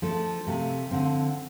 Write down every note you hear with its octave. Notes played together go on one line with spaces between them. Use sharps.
F3 A3 D4 A4
C3 F3 A3
D3 F3 C4